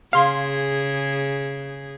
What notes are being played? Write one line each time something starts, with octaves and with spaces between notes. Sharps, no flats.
C#3 G#4 F5 C6